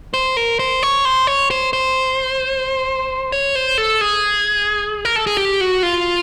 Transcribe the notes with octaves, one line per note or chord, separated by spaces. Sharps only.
C5
A#4
C5
C#5
C5
C#5
C5
C5
C#5
C5
A4
G#4
A#4
A4
G#4
G4
F#4
F4